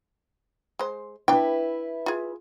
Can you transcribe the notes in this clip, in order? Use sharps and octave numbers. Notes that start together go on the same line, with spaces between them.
G#3 C5
D4 E4 B4 G5
F4 G#4